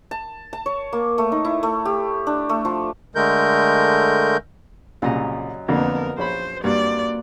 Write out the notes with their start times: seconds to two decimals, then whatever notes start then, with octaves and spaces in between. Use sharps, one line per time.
0.11 A5
0.53 A5
0.66 C#5
0.93 A#3
1.18 A3
1.32 D#4
1.45 E4
1.63 A3
1.85 G4
2.27 D4
2.49 A3
2.65 F3
3.15 D3 G#3 A3 A#4 G6
5.02 C2 F#2 A#2 C#3 D#5 A#5
5.68 F2 D3 A#3 B3 A#4
6.18 A#1 C5 C#5 B5
6.64 G2 A#3 C4 F#4 D5